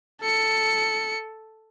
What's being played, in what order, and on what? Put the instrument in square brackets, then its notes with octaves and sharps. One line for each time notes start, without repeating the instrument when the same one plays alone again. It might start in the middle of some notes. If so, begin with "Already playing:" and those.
[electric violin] A4 C#7